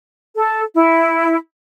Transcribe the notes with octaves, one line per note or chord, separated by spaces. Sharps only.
A4
E4